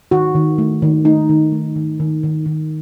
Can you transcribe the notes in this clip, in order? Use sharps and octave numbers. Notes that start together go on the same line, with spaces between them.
D#3 F#4
D#3
A3
D#3
A3 D#4
D#3
A3
D#3
D#3
D#3
D#3